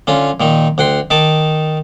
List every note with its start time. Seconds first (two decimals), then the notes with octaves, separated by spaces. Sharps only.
0.07 D3 C#4 F4
0.40 A#2 D#3 D#4
0.78 D2 F#5 G5 C6
1.11 D#3 D#4 A5 D6